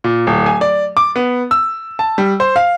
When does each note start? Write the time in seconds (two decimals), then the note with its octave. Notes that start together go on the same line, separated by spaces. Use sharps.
0.04 A#2
0.27 D1
0.46 G#5
0.61 D5
0.97 D6
1.16 B3
1.51 E6
1.99 A5
2.18 G3
2.40 C5
2.56 F5